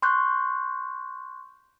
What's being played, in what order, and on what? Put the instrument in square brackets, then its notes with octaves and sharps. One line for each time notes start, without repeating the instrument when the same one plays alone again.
[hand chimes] C6 C#6 F#6 G6